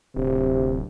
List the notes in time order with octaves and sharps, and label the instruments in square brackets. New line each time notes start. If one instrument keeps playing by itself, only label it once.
[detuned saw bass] D1 [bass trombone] C3